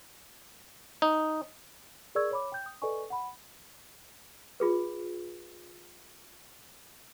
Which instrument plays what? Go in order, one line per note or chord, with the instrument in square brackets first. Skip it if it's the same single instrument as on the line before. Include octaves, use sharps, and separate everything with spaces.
[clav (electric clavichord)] D#4
[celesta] G#4 A#4 D5 C#6 E6 G#6
C#5 B5 D6
G5 G6
D#6
A4 B4 D5 D#5 G#5 C#6
F#5 B5
[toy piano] F4 G#4 B4